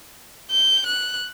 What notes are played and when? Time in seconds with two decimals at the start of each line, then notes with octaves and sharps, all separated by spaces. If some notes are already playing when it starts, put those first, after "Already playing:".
0.51 G6
0.86 F#6